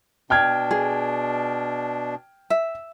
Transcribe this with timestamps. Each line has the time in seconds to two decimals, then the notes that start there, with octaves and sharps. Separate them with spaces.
0.30 B2 D4 G5 F6 G#6
0.71 G#4
2.50 E5